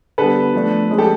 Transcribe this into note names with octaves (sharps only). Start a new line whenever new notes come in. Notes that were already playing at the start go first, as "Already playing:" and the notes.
D3 G3 B3 A4 B4
F3 A3 D4
F3 G#3 C#4
G4 A4